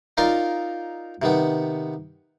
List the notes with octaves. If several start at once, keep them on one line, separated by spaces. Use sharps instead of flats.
D#4 F4 A#4 D5 F5 C6
C3 D#3 B3